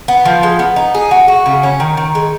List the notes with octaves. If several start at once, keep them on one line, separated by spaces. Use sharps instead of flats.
B3
F3
G#3
B3
D#4
G#4
F#4
F#4
C#3
C#4
D#3
D#3
G#3